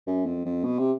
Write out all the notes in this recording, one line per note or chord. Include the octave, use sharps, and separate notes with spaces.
F#2
F2
F2
B2
C3